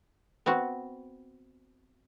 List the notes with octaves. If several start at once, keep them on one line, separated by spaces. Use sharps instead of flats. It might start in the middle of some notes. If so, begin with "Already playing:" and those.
B3 C4 F#4